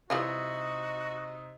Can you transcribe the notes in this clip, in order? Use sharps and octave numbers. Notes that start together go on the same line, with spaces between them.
C3 E3 G3 D#4 F4 F#4 D#6